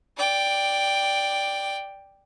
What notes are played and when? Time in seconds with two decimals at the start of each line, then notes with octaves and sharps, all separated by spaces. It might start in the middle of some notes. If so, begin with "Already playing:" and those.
0.17 D5 G5